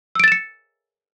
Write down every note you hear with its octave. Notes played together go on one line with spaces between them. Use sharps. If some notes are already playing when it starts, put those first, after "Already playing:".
E6 A6 C#7 D7 E7